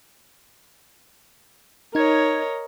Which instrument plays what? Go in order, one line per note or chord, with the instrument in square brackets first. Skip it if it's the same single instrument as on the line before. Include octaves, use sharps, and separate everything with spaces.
[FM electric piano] D#4 G#6 [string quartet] A#4 C#5 D#5